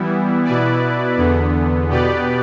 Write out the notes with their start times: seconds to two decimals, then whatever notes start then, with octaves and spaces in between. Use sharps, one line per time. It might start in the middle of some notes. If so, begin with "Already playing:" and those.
Already playing: E3 G3 B3 E4
0.44 B2 B3 E4 B4 D5
1.17 E2 D3 B3
1.90 B2 B3 G4 B4 D5